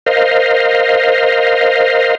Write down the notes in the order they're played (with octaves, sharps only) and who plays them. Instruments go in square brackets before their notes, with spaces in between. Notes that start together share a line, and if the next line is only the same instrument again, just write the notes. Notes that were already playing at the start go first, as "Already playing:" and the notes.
[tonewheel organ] A#4 C5 D#5 F5